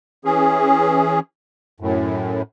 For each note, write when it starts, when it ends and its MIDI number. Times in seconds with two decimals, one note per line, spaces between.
0.25 1.20 52
0.25 1.20 61
0.25 1.20 68
1.80 2.42 42
1.80 2.42 45